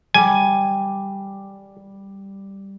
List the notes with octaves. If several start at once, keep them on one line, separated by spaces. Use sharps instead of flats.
G3 G#5